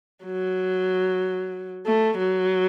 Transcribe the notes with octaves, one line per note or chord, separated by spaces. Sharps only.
F#3
A3
F#3